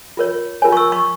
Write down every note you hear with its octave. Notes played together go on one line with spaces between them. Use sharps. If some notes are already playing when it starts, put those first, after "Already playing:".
F4 A#4 C#5
F4 A#4 C#5 G#5
C#6
E6
C#6